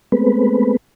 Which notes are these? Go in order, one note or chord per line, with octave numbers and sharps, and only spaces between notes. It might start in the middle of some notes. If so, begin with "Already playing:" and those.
G#3 A3 B3 C4 B4